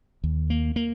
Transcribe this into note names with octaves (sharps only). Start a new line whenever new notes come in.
D#2
A#3
A#3